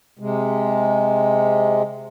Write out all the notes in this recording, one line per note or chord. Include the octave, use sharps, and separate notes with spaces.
C3 G#3